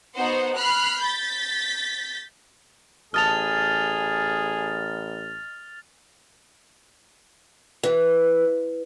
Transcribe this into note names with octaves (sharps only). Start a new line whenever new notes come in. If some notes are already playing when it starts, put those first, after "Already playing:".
B3 D#4 F#4 C5 F#5
B5 F6 F#6 C7
G6 A6 B6
A1 G#4 D#5 A5 F6 A6 F7
E3